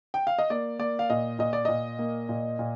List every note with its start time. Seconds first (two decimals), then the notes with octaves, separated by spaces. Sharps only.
0.14 G5
0.27 F5
0.38 D#5
0.50 A#3 D5
0.79 A#3 D5
0.99 F5
1.10 A#2 D#5
1.39 A#2 D#5
1.53 D5
1.65 A#2 D#5
1.99 A#3
2.29 A#2
2.59 A#2